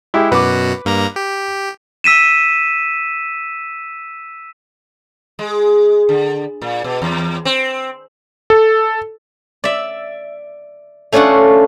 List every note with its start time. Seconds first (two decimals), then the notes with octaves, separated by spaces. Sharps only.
0.14 G#3 E4 G4
0.31 F#2 B2 F#4 B4 D6
0.85 G2 A#3 A#5
1.16 G4
2.04 E6 B6 D#7 E7
5.39 G#3
6.09 D3
6.62 A#2
6.84 B2
7.02 E2
7.45 C4
8.50 A4
9.64 D5 E5
11.12 A3 C#4 D4 F4 F#5